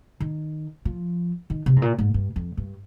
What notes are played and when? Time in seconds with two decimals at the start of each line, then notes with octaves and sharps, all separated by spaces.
0.20 D#3
0.85 F3
1.50 D#3
1.66 C3
1.76 G#2
1.82 A#2
1.98 G#2
2.14 G2
2.36 F2
2.57 G2